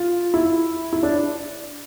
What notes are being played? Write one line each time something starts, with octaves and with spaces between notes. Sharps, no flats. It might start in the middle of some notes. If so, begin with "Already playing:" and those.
Already playing: F4
E4
E4
D4